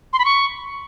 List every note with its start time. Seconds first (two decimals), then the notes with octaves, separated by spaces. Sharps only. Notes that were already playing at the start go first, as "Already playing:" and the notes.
0.13 C6
0.19 B5
0.25 C#6